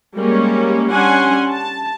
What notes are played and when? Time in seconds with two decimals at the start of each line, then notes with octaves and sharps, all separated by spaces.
0.16 G3 G#3 A#3 C#4
0.92 G3 C#4 D4 F#5 G#5 C6
1.49 A5